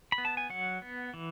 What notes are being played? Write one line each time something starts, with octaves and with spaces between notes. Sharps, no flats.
B5
B3
A5
G#5
F#3 F#5
B3
E3